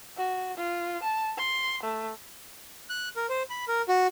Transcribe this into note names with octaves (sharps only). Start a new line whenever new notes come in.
F#4
F4
A5
C6
A3
F#6
A#4
C5
B5
A#4
F#4